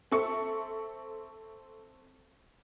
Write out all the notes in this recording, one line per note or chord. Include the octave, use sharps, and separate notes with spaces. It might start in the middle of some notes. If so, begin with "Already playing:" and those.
C4 A4 E5 C#6 C#7